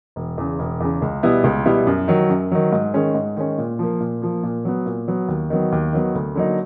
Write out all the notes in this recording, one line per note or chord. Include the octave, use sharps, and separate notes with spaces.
E1
E2 C#3
E1
E2 C#3
C#2
B2 G3 B3 E4
C#2
B2 G3 B3 E4
F#2
D#3 F#3
F#2
D#3 F#3
G#2
D#3 G#3 C#4
G#2
D#3 G#3 C#4
A#2
F3 A#3
A#2
F3 A#3
A#2
F#3 B3
A#2
F#3 B3
D#2
D#3 F#3 B3
D#2
D#3 F#3 B3
D2
D3 F#3 A#3 D#4